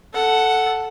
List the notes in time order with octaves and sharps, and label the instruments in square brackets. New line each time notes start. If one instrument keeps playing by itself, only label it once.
[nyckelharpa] A4 F#5